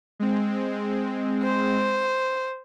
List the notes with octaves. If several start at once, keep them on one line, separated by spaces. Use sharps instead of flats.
G#3 C4
C5